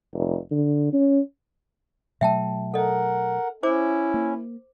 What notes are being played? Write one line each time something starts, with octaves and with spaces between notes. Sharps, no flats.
F1
D3
C#4
B2 F#3 A3 E5 G5 A5
A4 A#4 D#5 F#5
C#4 E4 C5 D6
A#3